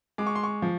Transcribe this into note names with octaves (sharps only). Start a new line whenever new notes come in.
G#3 D6
C#6
C6
C#6
F3